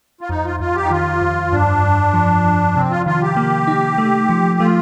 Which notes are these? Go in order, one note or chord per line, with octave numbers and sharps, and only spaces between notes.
F4
F2 D#4
F4
F2 F4
G4
D#4
D#3 F4
F2
G2 D4
G2
F3
F3
C3 C4
F4
D#3 F4
G4
A#3
D#4
A3
F3
A3 F4